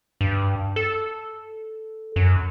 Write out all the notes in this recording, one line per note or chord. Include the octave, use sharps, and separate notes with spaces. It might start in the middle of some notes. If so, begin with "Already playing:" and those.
G2
A4
F#2